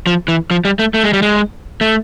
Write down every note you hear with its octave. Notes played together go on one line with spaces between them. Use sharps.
F3
E3
F3
G3
A3
A3
G#3
G3
G#3
A3